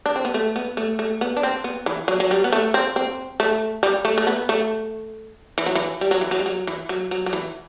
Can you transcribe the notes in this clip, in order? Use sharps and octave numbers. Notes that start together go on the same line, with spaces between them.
D4
C4
B3
A3
B3
A3
A3
B3
D4
C4
B3
E3
F#3
F#3
G3
B3
A3
C4
C4
A3
G3
A3
A3
B3
A3
E3
F#3
E3
G3
F#3
E3
F#3
G3
F#3
E3
F#3
F#3
F#3
E3